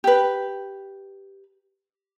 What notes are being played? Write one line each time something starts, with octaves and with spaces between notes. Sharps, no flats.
G4 B4